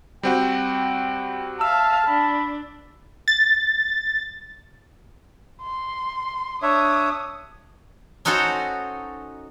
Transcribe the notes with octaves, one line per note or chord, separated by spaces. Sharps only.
G3 C4 F#4 G5
E5 F5 A5 E6
D4 B5
A6
C6
D4 C#5 E5 D#6
C#4 D#4 F#4 A4 C5 C#5